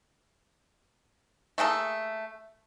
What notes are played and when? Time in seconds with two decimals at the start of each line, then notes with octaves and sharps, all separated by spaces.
1.58 A3 A#3 G#4 A4